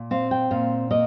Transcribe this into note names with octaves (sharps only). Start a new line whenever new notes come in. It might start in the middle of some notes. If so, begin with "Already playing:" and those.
Already playing: A#2
C4 F5
G5
A#2 F5
A#3 D#5